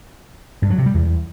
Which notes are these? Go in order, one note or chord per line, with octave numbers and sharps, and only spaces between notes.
G2
F#3
C3
G3
E2